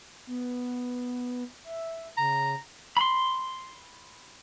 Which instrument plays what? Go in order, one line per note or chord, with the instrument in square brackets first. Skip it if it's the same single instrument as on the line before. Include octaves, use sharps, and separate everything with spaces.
[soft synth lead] B3
E5
[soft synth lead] C#3 [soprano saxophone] A#5
[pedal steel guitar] B5 C6